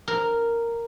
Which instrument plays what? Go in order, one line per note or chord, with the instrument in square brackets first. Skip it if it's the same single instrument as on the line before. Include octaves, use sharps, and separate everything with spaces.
[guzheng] A#4